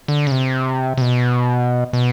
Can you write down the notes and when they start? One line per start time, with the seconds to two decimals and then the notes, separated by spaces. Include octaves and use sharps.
0.08 D3
0.27 C#3
0.31 C3
0.97 C3
1.01 B2
1.93 B2